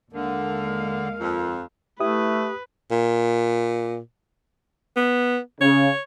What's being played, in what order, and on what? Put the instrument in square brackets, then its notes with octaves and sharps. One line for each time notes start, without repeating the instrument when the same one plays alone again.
[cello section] D#2 G#3 F5 [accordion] D3 [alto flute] A#4
[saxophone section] F2
[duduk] A3 [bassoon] E4 [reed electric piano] G4 D#6 [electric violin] B4
[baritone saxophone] A#2
[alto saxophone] B3
[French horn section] C#3 [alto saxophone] C#5